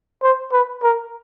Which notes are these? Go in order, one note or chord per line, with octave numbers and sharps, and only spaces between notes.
C5
B4
A#4